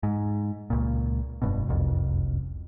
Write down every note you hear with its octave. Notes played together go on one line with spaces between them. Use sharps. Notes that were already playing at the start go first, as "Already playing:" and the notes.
G#2
C#2 A#2
F1 G2 B2
F#1 C2 F2